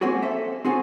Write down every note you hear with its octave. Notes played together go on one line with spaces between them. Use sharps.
A#3 C4 C#4 F#4 G#4
A4 C5 E5
C4 F#4 G#4 A4 C#5